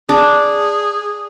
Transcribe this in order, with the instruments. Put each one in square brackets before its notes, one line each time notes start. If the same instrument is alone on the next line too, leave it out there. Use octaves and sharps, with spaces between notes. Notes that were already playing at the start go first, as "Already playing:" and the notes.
[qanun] D4 [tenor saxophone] G#4